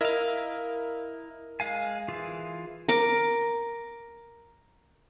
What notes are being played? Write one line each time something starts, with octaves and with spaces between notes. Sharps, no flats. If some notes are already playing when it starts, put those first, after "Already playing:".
E4 A#4 D#5 F5
G#3 F5 G#5
E3 F4 G#4
A#4 D6